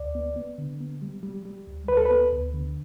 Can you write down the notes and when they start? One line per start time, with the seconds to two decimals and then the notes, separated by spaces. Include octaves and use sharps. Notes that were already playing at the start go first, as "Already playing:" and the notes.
Already playing: D2 D5
0.15 B3
0.36 B3
0.58 D3
0.81 B3
1.02 G3
1.23 G3
1.45 G3
1.68 D2
1.88 D2 B4
1.97 A4
2.05 B4
2.11 B3
2.32 D2
2.54 D3